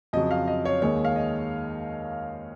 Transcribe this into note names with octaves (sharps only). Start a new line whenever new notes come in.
F2 C#3 F#3 D#5
F5
D#5
C#5
D#2 D#3 G#3 C#5
F5
D#5